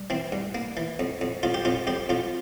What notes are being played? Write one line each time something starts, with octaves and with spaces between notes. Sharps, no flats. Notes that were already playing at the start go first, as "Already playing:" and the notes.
Already playing: G2
E3 C4
G2
A#3
E3
F2
F2
F2 F4
G4
F2 F4
F2 G4
F2 F4